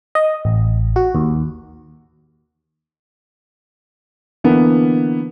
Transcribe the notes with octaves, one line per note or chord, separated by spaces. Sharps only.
D#5
A1
F#4
D#2
D3 E3 A#3 B3